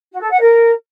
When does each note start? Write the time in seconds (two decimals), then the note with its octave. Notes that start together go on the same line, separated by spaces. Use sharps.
0.11 F#4
0.20 A4
0.30 F#5
0.39 A#4